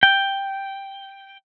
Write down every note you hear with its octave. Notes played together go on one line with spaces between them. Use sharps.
G5